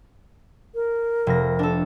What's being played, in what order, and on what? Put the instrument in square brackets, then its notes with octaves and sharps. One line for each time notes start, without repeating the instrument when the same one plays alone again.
[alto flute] A#4
[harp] F1 A#6
D4 A4